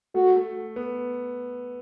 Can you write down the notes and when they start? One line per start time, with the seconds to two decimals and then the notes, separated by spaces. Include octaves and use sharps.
0.15 A3 F#4
0.36 A3
0.76 B3